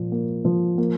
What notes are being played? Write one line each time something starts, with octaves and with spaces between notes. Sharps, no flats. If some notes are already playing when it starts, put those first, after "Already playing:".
Already playing: A#2 F3
A#3
F3
A#3